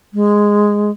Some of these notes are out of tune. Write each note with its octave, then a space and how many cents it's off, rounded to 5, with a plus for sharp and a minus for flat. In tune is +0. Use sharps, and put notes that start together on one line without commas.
G#3 -5